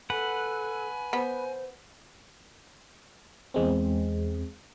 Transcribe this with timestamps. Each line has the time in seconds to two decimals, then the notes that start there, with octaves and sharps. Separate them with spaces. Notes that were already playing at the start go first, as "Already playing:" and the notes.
0.10 A4 B4 F#5 G#5
1.13 B3 C5
3.54 E2 G#3 C4